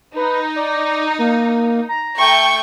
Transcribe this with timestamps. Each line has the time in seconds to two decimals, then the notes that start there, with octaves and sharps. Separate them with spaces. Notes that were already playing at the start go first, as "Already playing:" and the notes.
0.16 D#4 B4
0.56 D5
1.19 A#3
1.89 A#5
2.18 A3 G5 C#6